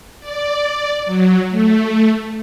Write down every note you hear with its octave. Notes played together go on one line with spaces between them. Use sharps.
D5
F#3
A3